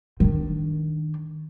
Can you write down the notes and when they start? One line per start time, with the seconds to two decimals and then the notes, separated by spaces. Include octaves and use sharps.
0.20 D#3 D4